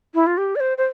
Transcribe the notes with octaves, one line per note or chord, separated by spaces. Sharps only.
E4
F4
G4
D5
C5
C5